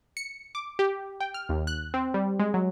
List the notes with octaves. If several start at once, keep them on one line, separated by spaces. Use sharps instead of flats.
C#7
D6
G4
G5
F6
D#2
F#6
C4
G3
G#3
F#3